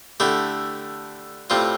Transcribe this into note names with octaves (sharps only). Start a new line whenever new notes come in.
D3 A3 E4 G4
A2 G3 C4 F4